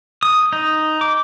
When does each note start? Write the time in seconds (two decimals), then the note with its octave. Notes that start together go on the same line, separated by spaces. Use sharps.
0.23 D#6
0.53 D#4
1.01 D6